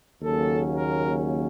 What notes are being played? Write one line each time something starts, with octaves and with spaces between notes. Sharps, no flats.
D#2 C#3 F#3 A#3 C#4 A4
A#4